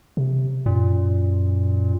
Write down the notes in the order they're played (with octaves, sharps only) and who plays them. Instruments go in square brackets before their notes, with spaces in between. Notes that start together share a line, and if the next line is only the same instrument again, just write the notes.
[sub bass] C3
[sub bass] F#2 [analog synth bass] A#2